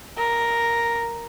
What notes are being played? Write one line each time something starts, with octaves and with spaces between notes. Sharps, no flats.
A#4